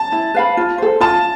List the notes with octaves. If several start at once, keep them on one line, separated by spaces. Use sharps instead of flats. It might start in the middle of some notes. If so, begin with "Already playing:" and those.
Already playing: A5
E4
B4 F5 B5
F4
A4 C5
F4 A5